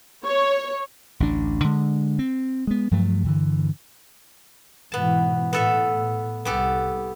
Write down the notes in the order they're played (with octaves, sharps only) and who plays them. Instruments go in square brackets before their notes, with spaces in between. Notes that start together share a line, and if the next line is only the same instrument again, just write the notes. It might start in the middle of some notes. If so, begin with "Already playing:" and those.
[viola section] C#5
[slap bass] A1 D2 D4
D3 G#3
C4
G#3 B3
G2 F3 F#3 A3
G2 D3 E3
[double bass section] G#2 B2 E3 [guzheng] B3 A5
[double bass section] A2 [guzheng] B3 A4 E5
[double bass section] C2 [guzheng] B3 G4 A4